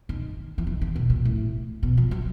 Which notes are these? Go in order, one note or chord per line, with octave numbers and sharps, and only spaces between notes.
D#3
E3
D#3
D3
B2
A#2
A2
B2
F3
F#3